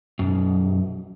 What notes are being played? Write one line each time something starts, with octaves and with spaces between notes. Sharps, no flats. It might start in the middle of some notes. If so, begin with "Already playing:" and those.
B1 F#2